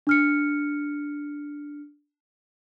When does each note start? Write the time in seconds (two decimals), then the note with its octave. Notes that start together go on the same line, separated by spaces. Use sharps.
0.07 D4 F6 C#7